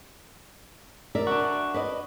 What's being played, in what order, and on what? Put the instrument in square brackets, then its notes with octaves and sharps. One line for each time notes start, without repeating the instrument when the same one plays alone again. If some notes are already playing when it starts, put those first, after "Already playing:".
[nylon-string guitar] A#4 D5 E5
[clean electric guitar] D4 F#4
[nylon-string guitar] B4 D5 D#5